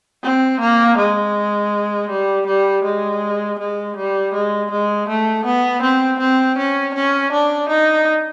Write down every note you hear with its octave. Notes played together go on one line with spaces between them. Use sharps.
C4
A#3
G#3
G3
G3
G#3
G#3
G3
G#3
G#3
A3
B3
C4
C4
C#4
C#4
D4
D#4